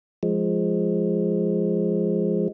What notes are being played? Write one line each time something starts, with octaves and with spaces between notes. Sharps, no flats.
F3 G#3